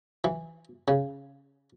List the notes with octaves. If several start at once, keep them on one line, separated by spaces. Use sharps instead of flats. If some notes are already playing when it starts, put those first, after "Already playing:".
E3
C#3